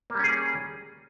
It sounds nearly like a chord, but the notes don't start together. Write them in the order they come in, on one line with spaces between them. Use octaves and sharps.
A#3 G3 C#4 G#4